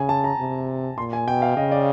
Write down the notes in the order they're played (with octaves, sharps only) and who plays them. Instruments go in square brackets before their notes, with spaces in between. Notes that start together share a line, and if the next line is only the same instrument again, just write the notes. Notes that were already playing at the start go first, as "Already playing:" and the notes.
Already playing: [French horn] C#3 [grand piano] G#5
[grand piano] A5
A#5
[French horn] C3
[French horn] A#2 [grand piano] C6
[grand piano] G#5
[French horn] B2 [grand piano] G5
[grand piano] F5
[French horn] C#3 [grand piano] D#5
[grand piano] D5